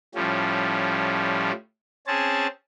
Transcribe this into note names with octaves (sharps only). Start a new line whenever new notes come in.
A2 F3 G3 C#4
C4 C#4 G#4 A5